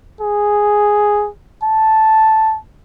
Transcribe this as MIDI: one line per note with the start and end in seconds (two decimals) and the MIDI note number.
0.21 1.28 68
1.63 2.57 81